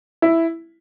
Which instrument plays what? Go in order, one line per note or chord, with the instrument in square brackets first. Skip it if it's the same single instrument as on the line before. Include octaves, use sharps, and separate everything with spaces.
[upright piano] E4